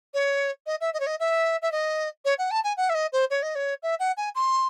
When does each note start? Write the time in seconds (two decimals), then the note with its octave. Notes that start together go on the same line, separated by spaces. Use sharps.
0.14 C#5
0.66 D#5
0.81 E5
0.94 D#5
1.00 C#5
1.06 D#5
1.20 E5
1.62 E5
1.72 D#5
2.25 C#5
2.38 F#5
2.51 A5
2.64 G#5
2.77 F#5
2.89 E5
2.94 D#5
3.12 C5
3.30 C#5
3.42 D#5
3.55 C#5
3.83 E5
3.99 F#5
4.17 G#5
4.35 C6